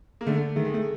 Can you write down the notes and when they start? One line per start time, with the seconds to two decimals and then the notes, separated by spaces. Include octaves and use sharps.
0.21 A#3
0.27 D3 A3
0.56 D#3 A3
0.65 G#3
0.74 A3